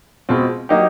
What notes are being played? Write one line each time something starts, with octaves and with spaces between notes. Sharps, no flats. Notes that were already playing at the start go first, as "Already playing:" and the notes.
B2 G#3 C4 F4
F#3 A#3 D#4 G4